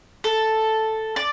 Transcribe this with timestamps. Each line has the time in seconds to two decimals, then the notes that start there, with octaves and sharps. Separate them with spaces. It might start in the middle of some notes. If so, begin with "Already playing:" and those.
0.24 A4
1.16 D5